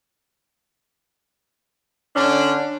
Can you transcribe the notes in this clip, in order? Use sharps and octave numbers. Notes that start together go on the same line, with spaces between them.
D3 C#4 D4